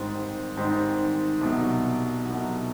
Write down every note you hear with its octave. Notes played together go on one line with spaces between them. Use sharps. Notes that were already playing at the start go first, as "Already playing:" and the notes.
Already playing: G#2 D#3 G3 C4
G#2 D#3 G3 C4
C2 B2 F#3
C2 B2 F#3